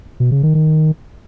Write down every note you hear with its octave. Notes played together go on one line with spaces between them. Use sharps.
B2
C#3
D#3
D#3